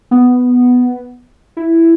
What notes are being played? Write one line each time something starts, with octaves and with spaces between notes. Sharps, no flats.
B3
E4